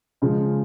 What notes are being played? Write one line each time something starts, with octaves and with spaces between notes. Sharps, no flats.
C#3 F3 G#3